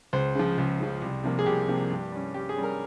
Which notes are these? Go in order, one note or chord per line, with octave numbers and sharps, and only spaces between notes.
C#2 C5
C#3 F3
C#2
C#3 F3
C2
C3 F3 A#3
G#4
C2 G4
C3 F3 A#3
G2
G3 C#4
G2 G4
G#4
G3 C#4
A#4